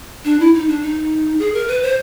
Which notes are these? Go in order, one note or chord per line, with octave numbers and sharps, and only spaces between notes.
D4
E4
D#4
D4
D#4
G#4
A#4
B4
C5